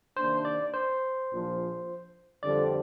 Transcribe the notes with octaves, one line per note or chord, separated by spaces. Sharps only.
C3 D#3 A#3 D4 C5
D5
C5
A#1 A#2 F3
F2 D3 G3 C4 G4 D5